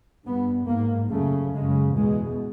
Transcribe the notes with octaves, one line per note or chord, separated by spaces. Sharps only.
G2 B3
G#2 A#3
F#2 C#3 A3
F#2 C#3 G#3
E2 B2 G#3